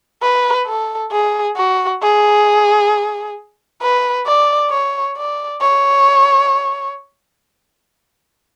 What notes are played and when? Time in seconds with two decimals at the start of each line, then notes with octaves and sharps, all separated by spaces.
0.22 B4
0.67 A4
1.11 G#4
1.57 F#4
2.02 G#4
3.82 B4
4.26 D5
4.71 C#5
5.17 D5
5.62 C#5